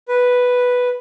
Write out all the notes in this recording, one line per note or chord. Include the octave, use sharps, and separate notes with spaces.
B4